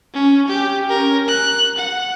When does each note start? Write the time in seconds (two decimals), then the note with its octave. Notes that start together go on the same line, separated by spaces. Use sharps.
0.14 C#4
0.48 G4
0.90 C#4 A#4
1.28 F#6
1.78 F#5